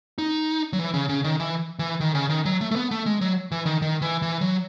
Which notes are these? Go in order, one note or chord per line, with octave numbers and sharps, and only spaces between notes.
D#4
F#3
E3
C#3
C#3
D#3
E3
E3
D#3
C#3
D#3
F#3
A3
A3
B3
A3
G#3
F#3
E3
D#3
D#3
E3
E3
F#3